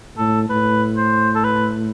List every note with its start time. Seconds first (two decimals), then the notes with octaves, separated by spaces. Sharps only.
0.18 A2 A4
0.49 A2 B4
0.97 C5
1.35 A4
1.44 B4